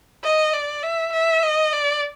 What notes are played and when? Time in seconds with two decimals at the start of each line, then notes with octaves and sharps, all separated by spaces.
0.24 D#5
0.53 D5
0.83 E5
1.13 E5
1.43 D#5
1.72 D5